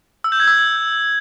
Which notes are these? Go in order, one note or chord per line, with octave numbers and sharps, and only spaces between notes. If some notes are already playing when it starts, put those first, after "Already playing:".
E6
G6
G#6
E6